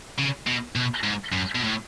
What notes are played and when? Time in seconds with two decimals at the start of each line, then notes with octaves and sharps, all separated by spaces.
0.19 C#3
0.47 B2
0.76 B2
1.03 G#2
1.32 F#2
1.55 B2
1.64 A2